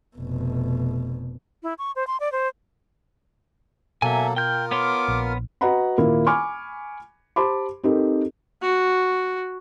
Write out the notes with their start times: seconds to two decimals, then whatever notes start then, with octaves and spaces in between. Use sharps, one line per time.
0.16 F1 B2
1.63 E4
1.79 C#6
1.96 C5
2.07 C6
2.20 D5
2.32 C5
4.02 B2 F#3 A#3 A4 E5 G#5
4.36 F4 A#4 G5 G6
4.71 B3 C#5 C6 D6
5.08 A#1
5.61 F#4 B4 D#5 F#5 A#5 B5
5.98 D#1 A#3 E4 F4 F5
6.26 G#5 B5 C#6 D6 F6
7.36 G4 C5 A5 B5 C6 D6
7.83 C4 D#4 G4 A4 A#4
8.62 F#4